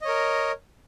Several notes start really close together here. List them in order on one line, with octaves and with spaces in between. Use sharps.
D#5 C#5 A#4